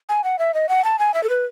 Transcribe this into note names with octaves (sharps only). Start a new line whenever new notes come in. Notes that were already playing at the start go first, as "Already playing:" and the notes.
G#5
F#5
E5
D#5
F#5
A5
G#5
E5
A4
B4